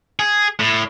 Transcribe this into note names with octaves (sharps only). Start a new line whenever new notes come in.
G#4
A2